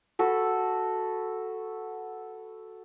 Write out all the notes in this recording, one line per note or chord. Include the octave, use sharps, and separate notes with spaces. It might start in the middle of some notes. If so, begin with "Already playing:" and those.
F#4 A4 B4